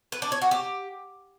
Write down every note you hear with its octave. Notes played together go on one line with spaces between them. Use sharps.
B4
D4
C#5
F#4
G4